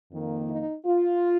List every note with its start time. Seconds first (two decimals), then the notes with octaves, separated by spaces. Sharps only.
0.11 F2 D#3 A#3
0.48 D#4
0.86 F4